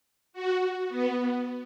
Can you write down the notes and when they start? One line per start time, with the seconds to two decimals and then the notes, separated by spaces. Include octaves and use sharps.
0.33 F#4
0.89 B3